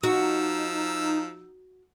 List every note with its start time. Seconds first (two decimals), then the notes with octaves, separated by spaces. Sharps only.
0.03 F3 D#4 F#4 E6